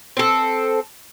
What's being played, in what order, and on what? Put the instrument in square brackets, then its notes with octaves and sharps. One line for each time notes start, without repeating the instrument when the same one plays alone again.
[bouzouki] C4 A4